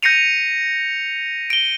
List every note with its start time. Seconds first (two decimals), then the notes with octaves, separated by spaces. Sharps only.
0.03 G6 A#6 C7 C#7 D#7 F7
1.50 D7 G7